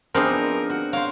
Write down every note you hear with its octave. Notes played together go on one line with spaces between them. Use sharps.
F3 B3 C4 D4 D#4 G#4 A#4
F#4
A#4 C5 C#5 F5